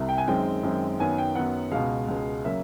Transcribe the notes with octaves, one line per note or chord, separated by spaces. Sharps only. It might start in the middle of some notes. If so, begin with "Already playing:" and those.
Already playing: C2 C3
G5
G#5
F#2 D#3 G#3 C4 G5
F#2 D#3 G#3 C4
F#2 D#3 F#3 B3 G#5
G5
F#2 D#3 F#3 B3 F#5
C#2 B2 G#3 F5
C#2 B2 G#3
C#3 F#3 A#3 E5